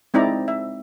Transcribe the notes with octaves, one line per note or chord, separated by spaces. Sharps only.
G#3 C4 D#4 E4 D5 A#5
E5